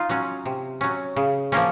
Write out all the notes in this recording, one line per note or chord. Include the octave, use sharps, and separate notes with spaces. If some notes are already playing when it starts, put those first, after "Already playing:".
Already playing: D#4 F4
F#3 C#4
C3
F#3 C#4
C#3
F3 A#3 C#4